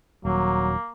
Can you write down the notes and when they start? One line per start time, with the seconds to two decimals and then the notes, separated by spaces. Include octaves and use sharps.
0.25 D#1 F#3 A#3